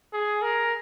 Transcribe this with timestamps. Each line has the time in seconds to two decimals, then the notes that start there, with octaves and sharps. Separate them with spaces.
0.13 G#4
0.42 A#4